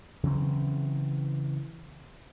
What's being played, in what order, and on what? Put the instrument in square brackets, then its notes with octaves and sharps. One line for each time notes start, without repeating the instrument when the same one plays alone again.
[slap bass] C#3 E3 F#3 C4